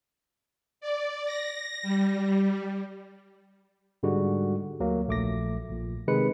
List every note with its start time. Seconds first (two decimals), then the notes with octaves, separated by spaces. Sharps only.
0.81 D5
1.25 A#6
1.83 G3
4.03 G#2 D3 G3 G#3 F#4
4.80 D2 F#3 A#3
5.07 A#1 A3 D6 A#6
5.70 A#1 A#2
6.08 C3 D#3 G#3 B4 C#7